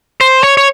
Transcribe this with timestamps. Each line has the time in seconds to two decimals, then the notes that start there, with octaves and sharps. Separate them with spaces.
0.21 C5
0.43 C#5
0.57 C#5